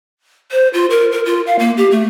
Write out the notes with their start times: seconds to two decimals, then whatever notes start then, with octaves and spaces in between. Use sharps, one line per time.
0.52 C5
0.74 F4
0.90 A#4
1.12 A#4
1.26 F4
1.47 F5
1.59 A#3
1.77 G4
1.91 A3